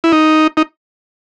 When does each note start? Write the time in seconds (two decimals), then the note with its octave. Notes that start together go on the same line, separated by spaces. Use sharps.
0.04 E4
0.12 D#4
0.57 D#4